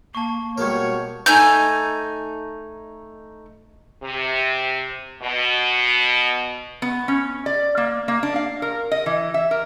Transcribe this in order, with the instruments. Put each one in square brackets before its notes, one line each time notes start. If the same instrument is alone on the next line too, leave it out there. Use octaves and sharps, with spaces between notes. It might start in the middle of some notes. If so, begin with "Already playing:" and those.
[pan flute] A#3 [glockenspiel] A5 C#6
[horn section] B2 F#4 C#5 [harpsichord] G3 G#3 A#4
[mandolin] A3 D#4 G#5 G6
[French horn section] C3
B2
[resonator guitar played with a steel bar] B3
C#4
D5
A#3
A#3
D4
F5
A#4
D#5
E3
E5
A#4